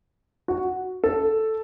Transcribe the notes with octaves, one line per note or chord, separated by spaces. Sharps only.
F#4
A4